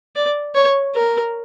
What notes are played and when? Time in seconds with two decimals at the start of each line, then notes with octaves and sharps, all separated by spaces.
0.16 D5
0.55 C#5
0.95 A#4